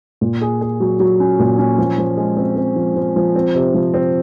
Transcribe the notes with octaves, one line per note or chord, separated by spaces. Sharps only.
A#2
G#4
G#4
F#3
F#3
C#4
A#2
C#4
F3
F3
G#3
C4
C4
F3
F3
F3
C4
C3
F3
C4